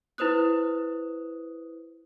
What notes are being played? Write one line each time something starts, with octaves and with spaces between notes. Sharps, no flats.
E4 B4 C5 D#6 F#6